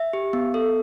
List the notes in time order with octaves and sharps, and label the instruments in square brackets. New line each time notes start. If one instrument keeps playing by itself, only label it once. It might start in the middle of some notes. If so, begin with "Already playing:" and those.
Already playing: [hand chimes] E5
G4
B3
A4